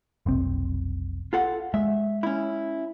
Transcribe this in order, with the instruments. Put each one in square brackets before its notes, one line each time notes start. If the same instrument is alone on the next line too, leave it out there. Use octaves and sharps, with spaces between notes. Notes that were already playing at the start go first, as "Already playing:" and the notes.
[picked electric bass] F1 B1 C4
[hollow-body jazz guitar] F4 A4 F#5
[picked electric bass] G#3 [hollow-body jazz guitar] E5
[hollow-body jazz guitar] C#4 E4